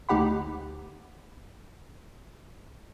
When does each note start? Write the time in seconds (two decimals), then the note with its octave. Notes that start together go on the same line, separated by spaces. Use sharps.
0.09 D2 D#4 G4 F#5 B5